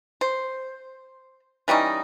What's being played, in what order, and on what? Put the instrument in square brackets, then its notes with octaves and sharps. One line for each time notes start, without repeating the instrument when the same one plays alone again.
[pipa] C5
E3 G3 C#4 D#4